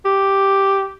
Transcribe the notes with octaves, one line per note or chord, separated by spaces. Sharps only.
G4